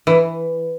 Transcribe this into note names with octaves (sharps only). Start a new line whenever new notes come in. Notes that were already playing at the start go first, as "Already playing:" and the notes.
E3